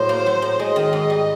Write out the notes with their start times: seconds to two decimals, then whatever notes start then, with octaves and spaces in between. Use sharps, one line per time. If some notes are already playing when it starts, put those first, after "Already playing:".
Already playing: A2 F#3 C5
0.09 A#3
0.26 F#3
0.42 A2
0.60 G#3 D#5
0.76 D#3
0.93 G#2
1.10 G3